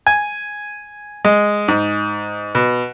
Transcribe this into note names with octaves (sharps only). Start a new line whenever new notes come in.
G#5
G#3
G#2
B2